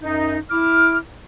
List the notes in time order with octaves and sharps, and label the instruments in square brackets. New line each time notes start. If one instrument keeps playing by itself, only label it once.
[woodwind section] F#2 D#4
E4 D6 F6